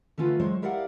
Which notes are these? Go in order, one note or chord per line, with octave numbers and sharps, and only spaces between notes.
D3 A3 C#4 F4 B4
F#3 G#3 C5 C#5
E4 G4 A#4 D5 F5 F#5